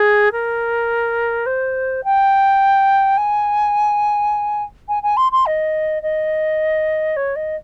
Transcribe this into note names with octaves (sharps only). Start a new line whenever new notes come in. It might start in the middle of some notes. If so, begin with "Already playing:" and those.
Already playing: G#4
A#4
C5
G5
G#5
G#5
G#5
C6
C6
D#5
D#5
C#5
D#5